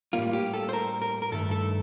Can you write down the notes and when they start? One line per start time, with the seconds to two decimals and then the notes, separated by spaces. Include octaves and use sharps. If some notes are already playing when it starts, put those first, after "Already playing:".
0.13 A2 G3 A#3 F4
0.33 G4
0.53 A4
0.69 C5
0.73 A#4
1.02 A#4
1.22 A#4
1.32 G2 D#3 A3 A4
1.51 A4